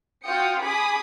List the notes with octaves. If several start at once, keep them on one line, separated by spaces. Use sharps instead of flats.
F4 F#4 G5 D#6 C#7
G#4 G#5 B5 D6 D#6